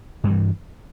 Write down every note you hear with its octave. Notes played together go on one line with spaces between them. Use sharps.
G2 E3 G3